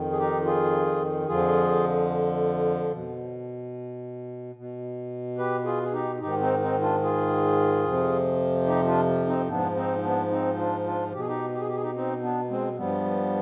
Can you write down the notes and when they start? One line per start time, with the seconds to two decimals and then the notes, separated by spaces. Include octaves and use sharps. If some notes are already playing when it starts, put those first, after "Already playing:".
Already playing: F2 D#3
0.11 G#4
0.18 D#4 G4
0.45 F4 G#4
1.27 F2 D3 F3 F4 G#4
2.92 B2
4.55 B2
5.38 G4 B4
5.65 F4 G#4
5.83 G#4
5.93 D#4 G4
6.20 G#2 D#3 D#4 G4
6.40 C4 D#4
6.61 C4 D#4
6.81 D4 F4
7.02 F4 G#4
7.84 F2 C3 F3
8.66 D#4 G4
8.86 D4 F4
9.27 C4 D#4
9.48 G#2 F3 B3 D4
9.75 C4 D#4
10.03 B3 D4
10.30 C4 D#4
10.57 D4 F4
10.85 D4 F4
11.12 B2 G4
11.20 G#4
11.27 D#4 G4
11.54 G4
11.60 G#4
11.68 G4
11.75 G#4
11.83 D#4 G4
11.94 C4 D#4
12.21 B3 D4
12.50 G#3 C4
12.76 G2 F3 G3 B3